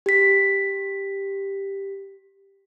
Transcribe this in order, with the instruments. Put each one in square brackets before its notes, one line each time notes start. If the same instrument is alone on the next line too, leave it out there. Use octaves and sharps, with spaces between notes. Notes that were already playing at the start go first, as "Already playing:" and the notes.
[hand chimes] G4 B6